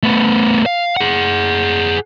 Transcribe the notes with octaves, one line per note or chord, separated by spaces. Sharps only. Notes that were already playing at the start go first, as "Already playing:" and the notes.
A3 B3
F5
G#4 F#5